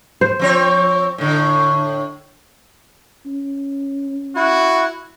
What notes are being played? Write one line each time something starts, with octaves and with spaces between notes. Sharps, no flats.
C5
F3 C4 C#5
A2 D3
C#4
E4 F#4